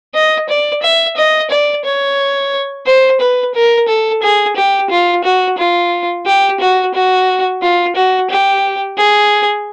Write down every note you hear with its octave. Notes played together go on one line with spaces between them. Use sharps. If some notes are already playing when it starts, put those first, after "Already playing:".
D#5
D5
E5
D#5
D5
C#5
C5
B4
A#4
A4
G#4
G4
F4
F#4
F4
G4
F#4
F#4
F4
F#4
G4
G#4